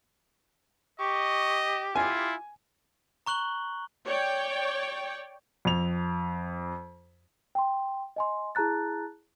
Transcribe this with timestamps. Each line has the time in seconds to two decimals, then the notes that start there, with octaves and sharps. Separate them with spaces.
1.00 G4 D#5 C#6
1.96 E4 F4 G#5
3.26 A#5 C#6 F#6 F#7 G7
4.05 C#5 D5 G5
5.65 F2 F7
7.55 G5 C6
8.16 D#5 G#5 C6
8.55 E4 G#4 A5 A#5 F#6 A6